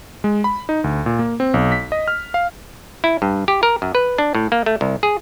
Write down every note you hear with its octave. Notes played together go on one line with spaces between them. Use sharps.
G#3
B5
D#4
D2
A#2
A#3
C4
B1
B6
D#5
F6
F5
E4
G2
G4
A#4
F#2
B4
D4
A2
A#3
A3
C2
G#4